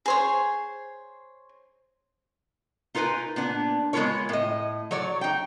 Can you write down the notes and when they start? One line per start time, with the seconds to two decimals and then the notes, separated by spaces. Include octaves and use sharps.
0.06 G#4 C5 C#5
2.95 D#4 F4 A#4 B4 G#5
3.36 A#2 B3 D4
3.93 G#3 B3 E4 F4 A#4 C#5
4.29 A2 D#5
4.91 F#3 C#5 D5
5.21 D#4 G5